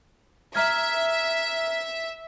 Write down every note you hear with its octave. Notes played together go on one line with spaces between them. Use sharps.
E5 A#5 F6 G#6